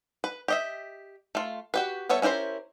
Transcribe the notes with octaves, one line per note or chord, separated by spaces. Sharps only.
B4
G4 D#5 E5
A3 F4
F#4 G4 B4
G3 B3 A4 C#5 E5
C#4 E4 G4 A#4 C5